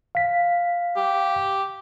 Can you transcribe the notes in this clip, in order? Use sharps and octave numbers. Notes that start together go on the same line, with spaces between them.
F5 B6
G4